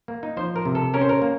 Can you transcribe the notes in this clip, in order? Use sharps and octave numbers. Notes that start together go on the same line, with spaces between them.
A#3
D#4
F3 C5
A#4
C3
A4
C#4 A#4
C5
A#4
A#3